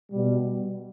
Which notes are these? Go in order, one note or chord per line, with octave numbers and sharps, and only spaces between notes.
B2 G3